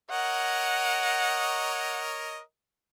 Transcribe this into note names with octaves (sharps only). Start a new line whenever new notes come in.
A#4 C#5 D#5 F#5